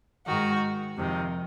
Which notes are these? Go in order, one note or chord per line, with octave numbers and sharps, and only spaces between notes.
G#2 D#3 F#4
F2 C3 D#3